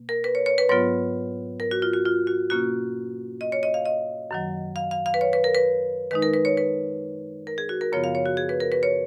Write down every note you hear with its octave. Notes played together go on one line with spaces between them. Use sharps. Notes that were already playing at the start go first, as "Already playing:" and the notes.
Already playing: B2 A#3
A#4
B4
C#5
C#5
B4
G#2 F#3 B3 F4 C#5
A#4
F#4
F4
F#4
F4
F#4
B2 A#3 C#4 F4 F#4
D#5
C#5
D#5
F5
D#5
F#2 D#3 F#3
F5
F5
F5
B4
C#5
B4
A#4
B4
D#3 G#3 D#4 B4
A#4
B4
C#5
B4
A#4
G#4
F#4
A#4
F#2 C#3 F3 B3 F4 C#5
F5
C#5
F#4
G#4
B4
A#4
B4
C#5